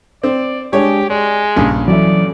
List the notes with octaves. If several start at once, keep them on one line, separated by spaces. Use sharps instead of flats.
C4 D5
G#3 D4 G4 G#4 C#5
G#3 D5
A#1 G2 C#3
E3 F#3 C#4 A4 D5 E5